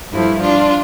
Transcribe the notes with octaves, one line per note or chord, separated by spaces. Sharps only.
G2 F3 A3 E4
D4 F4